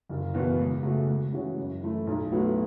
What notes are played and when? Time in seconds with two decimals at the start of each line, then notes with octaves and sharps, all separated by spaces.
0.09 F#1
0.34 E2 B2 B3
0.59 C#2
0.83 C#3 A3 C#4 F#4
1.08 C#2
1.32 C#3 E3 C#4 F#4
1.57 F#2
1.82 E3 A3 E4
2.07 B1
2.32 A2 F#3 B3 F#4